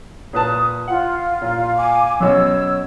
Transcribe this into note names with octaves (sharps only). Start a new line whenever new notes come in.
A#2 B4 A5 D#6
F4 F#5
A#2 F5
G#5 D6
F#2 B2 C#5 E6